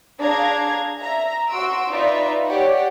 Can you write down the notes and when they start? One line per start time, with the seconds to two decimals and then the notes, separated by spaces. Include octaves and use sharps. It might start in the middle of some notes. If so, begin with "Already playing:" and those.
0.19 D4 G#4 F5 A#5 G#6 A#6
1.00 E5 A#5
1.49 F#4 C6 E6 D7
1.89 D#4 F4 B4 D5 E5
2.45 G4 C#5 D5 F#5